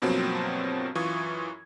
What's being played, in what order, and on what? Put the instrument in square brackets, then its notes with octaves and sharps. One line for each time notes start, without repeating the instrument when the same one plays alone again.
[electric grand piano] G2 B2 F3 F#3 A#3 C4
F#2 E3 F4 C#6 D#6 G#6